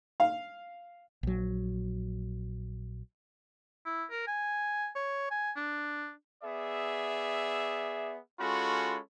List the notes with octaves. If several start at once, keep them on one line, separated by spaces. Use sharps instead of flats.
F5
A#1 F#3
E4
A#4
G#5
C#5
G#5
D4
B3 G#4 D5 E5
G#3 C#4 F4 F#4 A4 B5